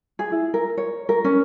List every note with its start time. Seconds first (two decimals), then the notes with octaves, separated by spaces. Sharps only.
0.19 G#4
0.32 E4
0.54 A#4
0.77 C#5
1.09 A#4
1.24 C#4